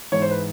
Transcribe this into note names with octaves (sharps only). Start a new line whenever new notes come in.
G#2 E3 C#5
C5
B4